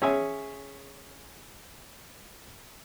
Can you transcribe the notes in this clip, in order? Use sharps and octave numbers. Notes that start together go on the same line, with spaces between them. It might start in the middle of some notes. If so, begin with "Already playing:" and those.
C#4 G#4 E5 G#5